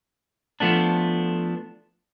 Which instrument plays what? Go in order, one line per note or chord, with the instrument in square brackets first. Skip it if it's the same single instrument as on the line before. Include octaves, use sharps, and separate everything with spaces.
[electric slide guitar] F3 A3 B3 D4